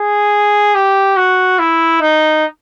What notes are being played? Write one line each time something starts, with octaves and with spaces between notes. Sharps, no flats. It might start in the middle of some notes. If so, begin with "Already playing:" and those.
Already playing: G#4
G4
F#4
E4
D#4